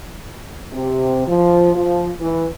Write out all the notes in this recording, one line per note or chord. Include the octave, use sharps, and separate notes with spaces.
C3
F3
F3
E3